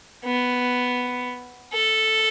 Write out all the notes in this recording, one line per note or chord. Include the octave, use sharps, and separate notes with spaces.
B3
A4